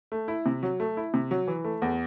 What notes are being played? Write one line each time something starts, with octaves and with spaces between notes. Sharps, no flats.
A3
E4
C3
F#3
A3
E4
C3
F#3
E3
A3
E2